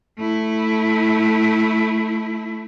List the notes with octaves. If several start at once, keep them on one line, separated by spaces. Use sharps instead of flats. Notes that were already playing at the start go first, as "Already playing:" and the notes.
A3 E4